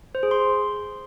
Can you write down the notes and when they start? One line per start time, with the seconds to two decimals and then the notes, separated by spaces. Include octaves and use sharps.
0.15 C5
0.23 G#4
0.31 C6